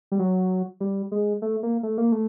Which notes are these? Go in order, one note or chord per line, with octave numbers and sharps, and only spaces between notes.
G3
F#3
G3
G#3
A3
A#3
A3
A#3
A3